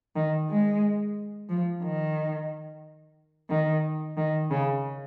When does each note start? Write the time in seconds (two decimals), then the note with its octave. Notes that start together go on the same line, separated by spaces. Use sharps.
0.16 D#3
0.49 G#3
1.49 F3
1.83 D#3
3.50 D#3
4.17 D#3
4.50 C#3